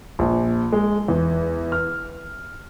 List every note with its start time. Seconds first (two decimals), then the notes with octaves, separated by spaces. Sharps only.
0.19 A#1
0.72 G#3
1.08 E2
1.72 F6